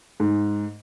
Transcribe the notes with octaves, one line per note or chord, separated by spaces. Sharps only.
G#2